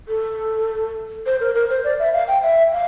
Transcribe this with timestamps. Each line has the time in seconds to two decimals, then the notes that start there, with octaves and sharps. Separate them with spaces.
0.08 A4
1.26 C5
1.40 A#4
1.55 A#4
1.70 C5
1.84 D5
1.99 E5
2.13 F5
2.28 G5
2.43 E5
2.72 F5